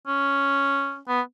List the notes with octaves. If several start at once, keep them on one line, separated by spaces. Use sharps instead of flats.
C#4
B3